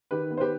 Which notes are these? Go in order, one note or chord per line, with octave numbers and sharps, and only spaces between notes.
D#3 G4 B4
B3
C5
G4 B4